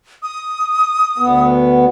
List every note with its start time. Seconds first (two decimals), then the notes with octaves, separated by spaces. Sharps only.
0.23 D#6
1.18 D2 B3